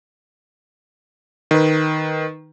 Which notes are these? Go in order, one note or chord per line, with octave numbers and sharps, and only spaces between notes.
D#3 B4